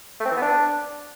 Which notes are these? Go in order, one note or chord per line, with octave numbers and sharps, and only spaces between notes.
A3
C4
E3
B3
D4